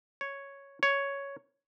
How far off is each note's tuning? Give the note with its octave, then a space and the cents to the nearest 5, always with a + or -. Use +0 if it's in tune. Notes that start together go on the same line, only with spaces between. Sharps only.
C#5 +0
C#5 +5